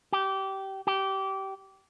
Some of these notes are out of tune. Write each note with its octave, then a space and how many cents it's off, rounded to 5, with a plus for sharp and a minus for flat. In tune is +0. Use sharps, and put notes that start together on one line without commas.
G4 -20
G4 -20